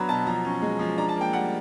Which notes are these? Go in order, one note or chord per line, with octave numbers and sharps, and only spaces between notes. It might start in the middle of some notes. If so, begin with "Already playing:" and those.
Already playing: F#3 B3 D4 A#5 B5 C#6
B2 A5
F3 A#5
C#4
G#3
F3
D4 A#5
A5
A#3
G5
G3 F#5